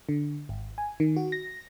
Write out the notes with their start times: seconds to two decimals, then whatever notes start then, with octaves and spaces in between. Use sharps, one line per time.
0.09 D3
0.49 G#1
0.78 G#5
1.00 D#3
1.16 F#4
1.32 A#6